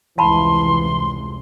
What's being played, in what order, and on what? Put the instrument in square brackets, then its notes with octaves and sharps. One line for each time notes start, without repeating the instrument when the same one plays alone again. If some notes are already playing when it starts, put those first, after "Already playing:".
[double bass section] F1 C#2 C3 [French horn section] E3 [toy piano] F5 A5 B5 [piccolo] C6